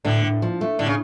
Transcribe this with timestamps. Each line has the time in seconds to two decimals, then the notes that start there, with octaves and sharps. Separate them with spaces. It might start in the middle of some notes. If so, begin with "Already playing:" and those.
0.05 A2 D3
0.24 A2
0.42 F3
0.61 A3
0.79 A2 D3
0.86 C#3